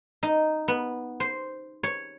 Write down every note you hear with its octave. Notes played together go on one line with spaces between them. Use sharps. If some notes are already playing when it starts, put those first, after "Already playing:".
D#4
B3
C5
C#5